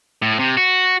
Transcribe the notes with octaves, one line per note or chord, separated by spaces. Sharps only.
A2
C3
F#4